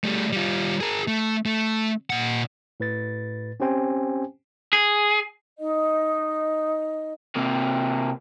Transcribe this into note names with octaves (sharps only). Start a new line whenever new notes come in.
G3 A3
G3 F4
G#4 A#4
A3
A3
A#2 F#5
A2 B4 A6
C4 C#4 G4 C5 G5 G#5
G#4
D#4 D#5
C3 A#3